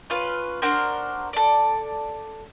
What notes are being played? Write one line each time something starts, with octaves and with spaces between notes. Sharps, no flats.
C#4 F4 B4
D4 F#4 A#4 C5
A4 D5